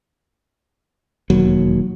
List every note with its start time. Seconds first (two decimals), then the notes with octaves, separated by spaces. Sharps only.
1.30 E1 D#2 F#3